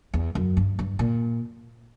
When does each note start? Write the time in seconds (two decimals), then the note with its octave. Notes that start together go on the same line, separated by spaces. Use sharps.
0.14 E2
0.35 F#2
0.57 G2
0.79 G2
0.99 A#2